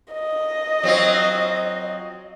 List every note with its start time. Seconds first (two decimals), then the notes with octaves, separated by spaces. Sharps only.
0.14 D#5
0.83 F#3 C4 F4